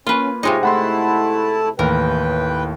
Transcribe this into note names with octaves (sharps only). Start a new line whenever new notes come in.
A#3 C#4 F4 B4
C3 G#3 D#4 F4 C#5
A3 E4 F#5 A5 B5 C6
D#2 A2 E3 A#4 B4 G5